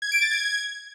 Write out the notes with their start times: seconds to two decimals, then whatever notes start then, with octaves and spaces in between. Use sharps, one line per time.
0.02 G#6
0.12 D7
0.21 A6
0.31 G#6